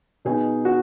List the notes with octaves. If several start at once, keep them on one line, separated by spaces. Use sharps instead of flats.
B2 B3 D#4 G#4
F#4